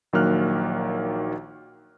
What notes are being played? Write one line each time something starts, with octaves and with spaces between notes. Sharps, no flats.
A#1 D#3 F#3 A#3 F6 F#6